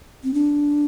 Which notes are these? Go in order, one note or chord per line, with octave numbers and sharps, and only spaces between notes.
C4
D4